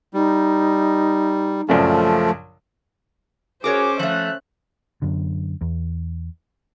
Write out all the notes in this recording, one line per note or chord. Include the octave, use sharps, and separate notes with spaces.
G3 D#4
A#1 F#2 C#3 F3 A3
C#4 F#4 G#4 A#4 C5 C#5 D6
F3 A3 E5 F#6
F#2 D3
E2